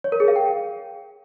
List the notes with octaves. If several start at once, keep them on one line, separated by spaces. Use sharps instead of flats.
C#5
A#4
G#4
F5
G5